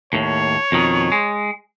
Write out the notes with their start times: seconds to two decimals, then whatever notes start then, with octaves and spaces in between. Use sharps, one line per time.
0.13 D#2 A2 C#5
0.72 F2 B2 D#3
1.12 G#3